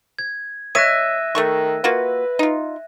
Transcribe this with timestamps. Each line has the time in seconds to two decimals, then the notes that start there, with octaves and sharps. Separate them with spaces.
0.19 G#6
0.75 C#5 E5 F#6 A#6 D#7
1.35 D#3 A3 A4 C#6
1.84 A#3 F4 F#4 B4
2.39 D#4 F4